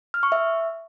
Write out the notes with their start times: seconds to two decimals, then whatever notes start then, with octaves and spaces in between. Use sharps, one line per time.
0.14 F6
0.23 C#6
0.32 E5